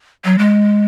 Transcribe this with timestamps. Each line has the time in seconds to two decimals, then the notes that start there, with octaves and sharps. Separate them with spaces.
0.25 F#3
0.38 G#3